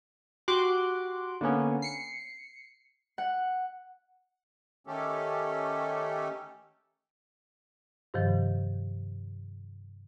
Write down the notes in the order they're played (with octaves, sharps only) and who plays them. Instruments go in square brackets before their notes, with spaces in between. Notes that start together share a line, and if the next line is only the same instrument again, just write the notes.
[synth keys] F#4 G4 C6 D6 F#6
D3 A#3 B3 C#4
C7 C#7
[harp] F#5
[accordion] D#3 A3 C#4 G4 A4
[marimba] G2 C3 D#3 F3